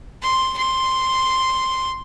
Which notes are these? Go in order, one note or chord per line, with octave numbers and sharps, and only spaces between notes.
C6
C6